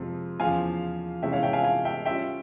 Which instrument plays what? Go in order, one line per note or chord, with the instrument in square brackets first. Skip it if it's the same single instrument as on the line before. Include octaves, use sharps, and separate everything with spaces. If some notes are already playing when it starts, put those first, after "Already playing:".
Already playing: [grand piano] F2 C3 F3 G#3
[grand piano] E2 C#3 F3 [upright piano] F5 G#5
[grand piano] C3 E3 G#3 C#4 [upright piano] E5 G5
[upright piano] C#5 F5
E5 G5
F5 G#5
F5 G#5
E5 G5
[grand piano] G3 C#4 F4 [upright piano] E5 G5